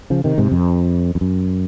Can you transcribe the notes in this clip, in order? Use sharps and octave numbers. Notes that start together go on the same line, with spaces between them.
C#3 F3
C3 D#3
G#2 C3
F2
F2
F#2